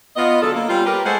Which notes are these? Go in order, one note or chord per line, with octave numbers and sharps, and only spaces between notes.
B3 F4 D#5
D3 F#3 G#3 A4
A#3
G3 B3 C#4 F4
G4 A#4 B4
G#3 A3 G#4 A4 C5 F#5